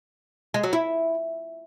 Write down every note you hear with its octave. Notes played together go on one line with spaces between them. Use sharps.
G#3
F#3
E4